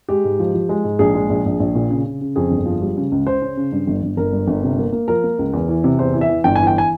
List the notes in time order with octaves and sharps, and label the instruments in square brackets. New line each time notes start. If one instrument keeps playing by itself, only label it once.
[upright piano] G#3 G4
G#2
F3
F3
G#3
G#2
A#1 G#4
G#3
A#1
A#1
A#1
A#2
C#3
C#3
C#3
F2 G#4
G1
F3
G3
C#3
C#2
C#3 C5
C#4
C#3
G2
G1
G1
G1 A#4
G2
G1
C3
A#3
A#3
F3 A#4
A#3
C#2
E2
E3
C3
E2 C5
E3
E5
E3
G1 G5
G#5
E3
G5
G#5